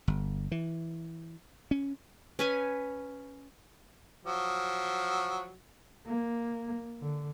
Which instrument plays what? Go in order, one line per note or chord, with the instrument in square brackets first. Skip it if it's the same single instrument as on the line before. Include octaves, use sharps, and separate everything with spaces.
[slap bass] G1
E3
C#4
[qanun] C#4 B4 G#5
[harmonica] F3 F#3
[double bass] A#3
D3